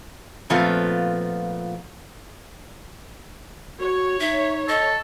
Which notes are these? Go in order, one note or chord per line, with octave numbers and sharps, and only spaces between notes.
A#2 F3 A3 B3 C4 F4
F#4 C#5
D#4 E5
A4 D#5